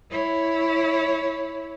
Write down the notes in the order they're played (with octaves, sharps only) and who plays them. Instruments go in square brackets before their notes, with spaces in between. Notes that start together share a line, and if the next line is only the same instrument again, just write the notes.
[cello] E4 C#5